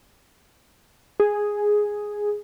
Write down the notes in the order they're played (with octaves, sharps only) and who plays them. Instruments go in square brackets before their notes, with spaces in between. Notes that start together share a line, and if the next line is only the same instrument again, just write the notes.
[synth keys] G#4